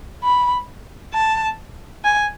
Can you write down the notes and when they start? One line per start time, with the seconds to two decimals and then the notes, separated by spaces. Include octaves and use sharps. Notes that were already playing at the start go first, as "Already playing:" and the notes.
0.23 B5
1.14 A5
2.05 G#5